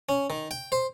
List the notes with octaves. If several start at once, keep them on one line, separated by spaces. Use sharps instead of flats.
C#4
D#3
G5
C5